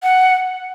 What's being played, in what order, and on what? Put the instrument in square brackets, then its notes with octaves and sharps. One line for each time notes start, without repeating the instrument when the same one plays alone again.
[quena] F#5